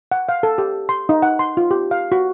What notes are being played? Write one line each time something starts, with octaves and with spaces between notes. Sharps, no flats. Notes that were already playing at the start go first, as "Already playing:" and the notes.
F#5
F5
A4
G4
C6
D#4
F#5
C6
F4
G4
F5
F#4